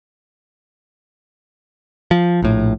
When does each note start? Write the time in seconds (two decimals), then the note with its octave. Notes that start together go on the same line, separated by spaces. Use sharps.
2.11 F3
2.42 A#1 A2